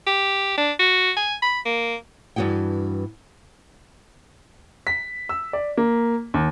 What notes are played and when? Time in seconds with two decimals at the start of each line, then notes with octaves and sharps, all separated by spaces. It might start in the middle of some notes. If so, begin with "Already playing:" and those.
0.06 G4
0.57 D4
0.79 F#4
1.16 G#5
1.42 B5
1.65 A#3
2.36 G2 E3 F#4 G#4 G5
4.87 B6
5.29 E6
5.53 D5
5.77 A#3
6.34 D#2